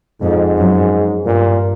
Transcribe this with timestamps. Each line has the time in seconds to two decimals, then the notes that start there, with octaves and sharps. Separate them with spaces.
0.22 F2 G#2
0.57 F#2
1.26 G2 A#2